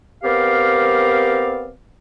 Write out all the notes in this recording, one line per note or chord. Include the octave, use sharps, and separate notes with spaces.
B3 C4 G4 A#4 D5 F5